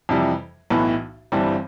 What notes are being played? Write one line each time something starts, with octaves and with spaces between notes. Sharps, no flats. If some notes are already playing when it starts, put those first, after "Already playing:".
F2 C3 E3 G3
B1 A2 E3 B3
G1 G2 E3 G3 C4